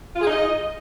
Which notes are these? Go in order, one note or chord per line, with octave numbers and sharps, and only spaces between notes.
F4
G#4
D#4
D#5